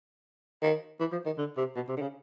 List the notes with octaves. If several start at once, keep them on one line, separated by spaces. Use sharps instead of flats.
D#3
E3
F3
D#3
D3
C3
B2
C3
D3
C#3